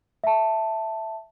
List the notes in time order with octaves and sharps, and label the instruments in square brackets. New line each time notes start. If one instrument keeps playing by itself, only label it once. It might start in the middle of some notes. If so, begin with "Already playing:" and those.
[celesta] E5 A5